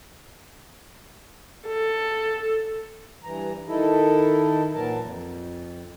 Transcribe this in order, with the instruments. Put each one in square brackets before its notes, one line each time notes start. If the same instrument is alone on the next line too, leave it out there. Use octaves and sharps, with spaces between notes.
[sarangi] A4
[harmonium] G2 E3 A#5
D#3 D#4 E4 A4
A#2 E3 F#3 A#4 A5
F2